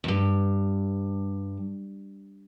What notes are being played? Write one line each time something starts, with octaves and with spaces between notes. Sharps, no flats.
E2 G2